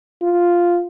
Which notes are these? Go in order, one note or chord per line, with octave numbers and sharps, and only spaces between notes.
F4